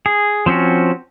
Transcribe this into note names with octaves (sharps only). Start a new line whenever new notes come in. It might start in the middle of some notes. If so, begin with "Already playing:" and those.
G#4
F3 C4 C#4 F#4